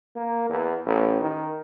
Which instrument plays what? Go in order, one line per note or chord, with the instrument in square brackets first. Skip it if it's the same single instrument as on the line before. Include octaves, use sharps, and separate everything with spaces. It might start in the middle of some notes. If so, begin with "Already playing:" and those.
[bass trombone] A#3
E2
A1
D#3